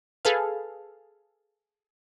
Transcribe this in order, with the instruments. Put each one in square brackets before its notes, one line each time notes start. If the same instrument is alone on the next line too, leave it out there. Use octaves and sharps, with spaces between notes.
[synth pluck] G#4 A4 B4 F5